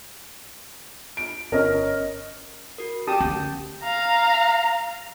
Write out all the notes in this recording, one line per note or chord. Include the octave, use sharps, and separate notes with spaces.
D7
G1 C#4 A#4 D#5
F#4 A#4
G4 A5 D#6
D2 C#4
F5 A#5